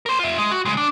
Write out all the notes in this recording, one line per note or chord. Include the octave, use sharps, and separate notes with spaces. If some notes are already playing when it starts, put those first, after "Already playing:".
A#4 C5
F4 E5
G#3
F#4
C#3 G#3
D4